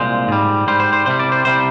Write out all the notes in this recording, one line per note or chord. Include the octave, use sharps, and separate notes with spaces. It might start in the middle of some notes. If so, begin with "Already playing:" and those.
Already playing: C2 A#2 G#3 C5
G#2 G3
G#2 G3 C5
C5
C5
C2 C3 G3 C5
D5
C5
C2 C3 G3 C5